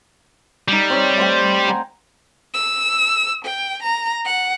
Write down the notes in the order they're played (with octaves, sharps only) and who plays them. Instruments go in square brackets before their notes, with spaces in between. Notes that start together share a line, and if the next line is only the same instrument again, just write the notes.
[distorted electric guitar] G3 [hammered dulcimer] D#4 A4
[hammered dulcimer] C4 C#5 D5
A3 C5 G5
F#5 G#5 A#5
[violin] E6
G5
A#5
F#5